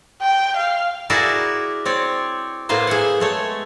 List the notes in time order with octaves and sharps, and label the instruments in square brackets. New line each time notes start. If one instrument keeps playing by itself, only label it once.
[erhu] G5
F5
[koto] E4 F#4 G#4 A#4 D5 E5
C4 C#5 D5
A2 A#3 B3 C5
G#4 E5 F#5
G#3 A3 C#5